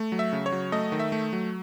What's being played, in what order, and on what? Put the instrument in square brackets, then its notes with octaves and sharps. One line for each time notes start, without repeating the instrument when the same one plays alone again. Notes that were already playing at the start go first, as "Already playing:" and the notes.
Already playing: [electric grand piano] A3
F#3
E5
C#3
C#5
F#3
A3 D#5
D#3
E5
A3
F#3